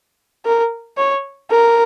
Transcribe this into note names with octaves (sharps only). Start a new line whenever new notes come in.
A#4
C#5
A#4